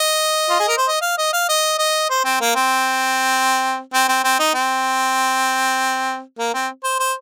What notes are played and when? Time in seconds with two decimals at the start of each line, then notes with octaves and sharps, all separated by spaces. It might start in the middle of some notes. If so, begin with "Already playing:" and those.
Already playing: D#5
0.50 F4
0.60 G#4
0.68 A#4
0.77 C5
0.87 D#5
1.01 F5
1.17 D#5
1.33 F5
1.49 D#5
1.78 D#5
2.10 C5
2.25 C4
2.41 A#3
2.55 C4
3.94 C4
4.08 C4
4.24 C4
4.39 D#4
4.54 C4
6.38 A#3
6.54 C4
6.84 C5
6.99 C5